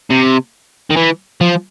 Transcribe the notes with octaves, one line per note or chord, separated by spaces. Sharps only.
C3
D#3
E3
F3